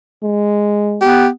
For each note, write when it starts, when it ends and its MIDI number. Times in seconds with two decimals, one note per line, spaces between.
0.23 1.06 56
1.01 1.29 59
1.01 1.27 67